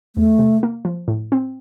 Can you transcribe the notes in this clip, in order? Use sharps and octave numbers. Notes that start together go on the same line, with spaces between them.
E2 A3
C3
A#3
F3
A2
C4